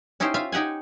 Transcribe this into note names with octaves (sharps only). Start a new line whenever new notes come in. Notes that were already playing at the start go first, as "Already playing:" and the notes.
C#4 D#4 E4 G4 C5
F4 E5 F5
D#4 G4 F#5 G#5